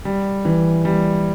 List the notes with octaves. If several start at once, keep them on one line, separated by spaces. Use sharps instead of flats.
G3
E3
G3